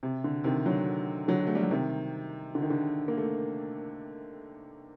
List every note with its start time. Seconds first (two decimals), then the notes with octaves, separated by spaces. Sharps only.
0.03 C3
0.24 D3
0.44 C3 D#3
0.66 D3 F#3
1.28 D3 F#3
1.47 A3
1.55 G3
1.63 F#3
1.71 C3 D#3
2.55 D3
2.62 D#3
2.70 D3
3.08 A#3
3.18 A3